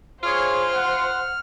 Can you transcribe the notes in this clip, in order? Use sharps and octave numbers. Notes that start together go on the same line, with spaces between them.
F4 G#4 C5 C#5 F6
F#5